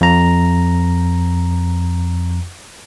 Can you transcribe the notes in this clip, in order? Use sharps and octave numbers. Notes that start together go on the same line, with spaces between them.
F2 A#5